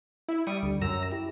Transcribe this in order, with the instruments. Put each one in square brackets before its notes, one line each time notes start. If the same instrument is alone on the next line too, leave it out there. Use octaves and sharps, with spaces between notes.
[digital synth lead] E4
[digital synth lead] G3 [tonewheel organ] G5 C#6 D#6
[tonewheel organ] D2 D3
[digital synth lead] F#2 [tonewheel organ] A#5 E6 A#6
[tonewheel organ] E4 G4